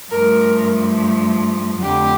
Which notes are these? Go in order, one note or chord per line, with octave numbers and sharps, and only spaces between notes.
G2 F3 A3 A#4
F2 D3 A3 G4